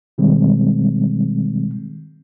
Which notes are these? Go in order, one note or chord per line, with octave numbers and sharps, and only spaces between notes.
B2 D#3 G3 G#3 C4